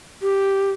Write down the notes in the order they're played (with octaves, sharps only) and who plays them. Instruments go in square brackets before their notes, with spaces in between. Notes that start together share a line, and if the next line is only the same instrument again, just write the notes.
[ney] G4